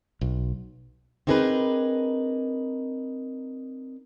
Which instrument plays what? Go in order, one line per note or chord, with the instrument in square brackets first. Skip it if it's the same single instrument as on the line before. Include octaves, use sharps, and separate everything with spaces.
[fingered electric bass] B1
[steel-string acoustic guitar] C4 D4 D#4 G#4 A#4 B4